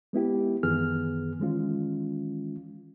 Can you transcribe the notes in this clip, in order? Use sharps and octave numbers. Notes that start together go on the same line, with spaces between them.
G#3 B3 E4 G4
F#2 D#3 E3 B3 G#4 F6
D#3 E3 G#3 C#4 F4